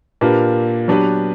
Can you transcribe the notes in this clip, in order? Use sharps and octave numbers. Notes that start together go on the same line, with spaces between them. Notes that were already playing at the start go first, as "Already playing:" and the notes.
A#2 A#3 D4 G4 B4
F#3 B3 D4 G4 B4